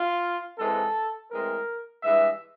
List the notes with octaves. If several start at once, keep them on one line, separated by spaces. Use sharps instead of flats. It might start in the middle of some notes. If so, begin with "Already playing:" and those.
Already playing: F4
G#2 E3 G#3 C4 A4
A2 E3 G#3 C4 A#4
G2 E3 G#3 E5